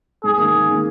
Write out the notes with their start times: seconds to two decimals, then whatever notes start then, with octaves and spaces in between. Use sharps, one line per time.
0.24 G#2 G#4
0.38 D#3 A#3
0.53 G#2
0.69 D#3 A#3